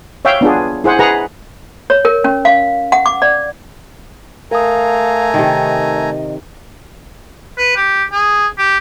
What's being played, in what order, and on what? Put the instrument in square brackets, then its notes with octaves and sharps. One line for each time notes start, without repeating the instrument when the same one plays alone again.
[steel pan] C#5 E5 F5 G5
B3 D4 F4 G#4
E4 G#4 C5 F#5
G#4 B4 F#5 A#5
[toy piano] C#5
A#4
C#4
F5
F#5
D6
D5
[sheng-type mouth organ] A3 G#5 A#5 [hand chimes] A#4 D#6 [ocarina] F5
[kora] C3 D#3 [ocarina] D#5
[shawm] B4
G4
G#4
G4